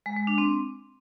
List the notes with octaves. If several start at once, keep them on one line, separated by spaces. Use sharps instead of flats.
G#3
G#3
D4
C4